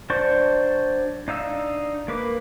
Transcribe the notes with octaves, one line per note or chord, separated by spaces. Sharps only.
F#3 D4 C5 D5 C#6
D4 D#4 F5 E6
A#3 B4 D6